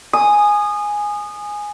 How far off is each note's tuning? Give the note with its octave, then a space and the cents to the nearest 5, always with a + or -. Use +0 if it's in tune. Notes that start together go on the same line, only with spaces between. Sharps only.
G#5 +0 D#6 -20